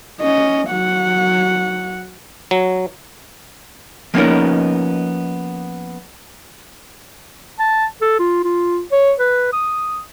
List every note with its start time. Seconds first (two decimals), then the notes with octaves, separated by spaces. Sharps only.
0.21 C#4 D#5
0.70 F#3 F#5
2.51 F#3
4.14 F3 A#3 B3 C#4 D#4 A#4
7.59 A5
8.01 A4
8.19 F4
8.44 F4
8.92 C#5
9.19 B4
9.53 D#6